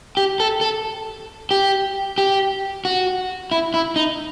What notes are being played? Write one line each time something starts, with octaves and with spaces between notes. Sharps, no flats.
G4
A4
A4
G4
G4
F#4
E4
E4
D#4